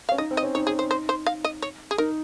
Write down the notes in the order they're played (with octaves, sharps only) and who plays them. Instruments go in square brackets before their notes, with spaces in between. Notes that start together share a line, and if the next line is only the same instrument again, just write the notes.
[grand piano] C#4 [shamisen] F5
[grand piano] D#4 [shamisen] D#5
[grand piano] C4
[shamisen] D#5
[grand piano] C#4
[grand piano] D#4 [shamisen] C#5
[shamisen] G#4
C5
C5
C5
F5
D#5
C#5
G#4
[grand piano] D#4 [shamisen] A#4